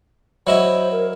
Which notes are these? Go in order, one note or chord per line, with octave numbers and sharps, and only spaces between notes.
F#3 E4 C5 D#5
A#4